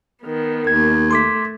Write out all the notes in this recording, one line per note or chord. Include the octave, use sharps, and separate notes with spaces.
D#3 B3
D#2 G#6
A3 C6 D6 B6